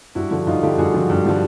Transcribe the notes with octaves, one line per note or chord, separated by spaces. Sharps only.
G2 E4 F#4
D3 F3
G2 D#4 F4
D3 F3 F4 G4
G2 F#4 G#4
D3 F3
G2
D3 F3